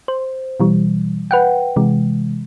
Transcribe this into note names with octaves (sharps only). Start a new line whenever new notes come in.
C5
B2 E3 G3
B4 F#5 G5
C3 E3 G#3